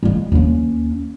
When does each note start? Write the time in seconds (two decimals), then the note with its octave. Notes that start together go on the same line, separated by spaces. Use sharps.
0.03 G3 G#3
0.32 D#2 C#4